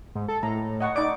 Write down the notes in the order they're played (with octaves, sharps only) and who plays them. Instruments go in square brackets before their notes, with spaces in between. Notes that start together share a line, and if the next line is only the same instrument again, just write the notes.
[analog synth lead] G#2
A4
[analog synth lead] A2 [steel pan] A#5
[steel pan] D#5 F#5 C#6
[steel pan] D#4 D5 [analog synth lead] D6